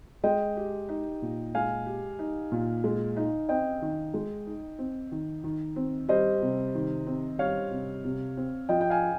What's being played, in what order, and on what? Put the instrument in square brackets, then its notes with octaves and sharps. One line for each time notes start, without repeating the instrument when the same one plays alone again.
[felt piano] G#3 [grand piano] D#5 G5
[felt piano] G4
D#4
A#2
[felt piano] G#3 [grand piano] F5 G#5
[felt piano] G4
D#4
A#2
G#3
D#4
[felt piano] C4 [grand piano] D#5 G5
[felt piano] D#3
G#3
D#4
C4
D#3
D#3
C4
[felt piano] G3 [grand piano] C5 D#5
[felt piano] C3
D#3
C4
[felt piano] G3 [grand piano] C#5 F5
[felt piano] C3
C3
C4
[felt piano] F3 [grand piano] D#5 G5
[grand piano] G5
F5 G#5